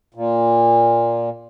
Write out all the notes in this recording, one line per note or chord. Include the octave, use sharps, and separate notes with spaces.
A#2